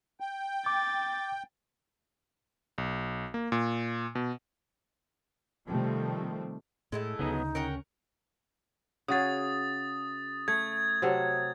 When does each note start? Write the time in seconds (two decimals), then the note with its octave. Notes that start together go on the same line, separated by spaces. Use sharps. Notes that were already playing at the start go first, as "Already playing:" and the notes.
0.20 G5
0.66 D6 A6
2.78 B1
3.34 A#3
3.52 A#2
4.15 B2
5.68 C3 D#3 F3 G3 A3 C4
6.92 A2 G#3 A3 E4
7.19 D2 C#3 F#3 B3 D#4 D#5
7.55 C#4 A#4 F#5 G5
9.08 C#3 F#4 G#4 D#6 A6
10.48 A3 G#6
11.02 C3 F#3 A4